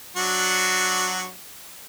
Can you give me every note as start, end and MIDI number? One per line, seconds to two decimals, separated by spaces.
0.17 1.29 54
0.17 1.29 62
0.17 1.29 66